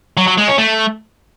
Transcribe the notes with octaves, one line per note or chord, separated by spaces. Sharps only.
F#3
F#3
G#3
C#4
A3